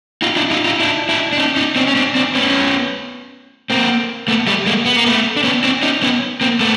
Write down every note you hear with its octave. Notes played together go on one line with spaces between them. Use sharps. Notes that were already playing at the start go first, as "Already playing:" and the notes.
D#4 F4
D4 E4
D#4 F4
D#4 F4
D4 E4
D4 E4
D4
C#4 D#4
C#4 D#4
C4 D4
C#4
C4 D4
C4 D4
B3 C#4
A#3 C4
A3 B3
G3 A3
G#3 A#3
B3
A#3
A3 B3
D4
B3 C#4
C4 D4
C#4 D#4
B3 C#4
A#3 C4
A3 B3